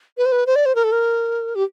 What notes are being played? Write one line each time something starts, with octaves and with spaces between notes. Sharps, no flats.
B4
C5
B4
C5
D5
C5
A#4
A4
A#4
G4